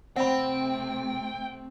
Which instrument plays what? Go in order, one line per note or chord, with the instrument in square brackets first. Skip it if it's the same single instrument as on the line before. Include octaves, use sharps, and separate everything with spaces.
[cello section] C3 A3 [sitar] C4 [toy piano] F#5 B5 [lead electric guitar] G5